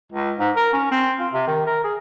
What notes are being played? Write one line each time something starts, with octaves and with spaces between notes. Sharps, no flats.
C#2
G#2
A#4
C#4
C4
F4
C3
D#3
A#4
G#4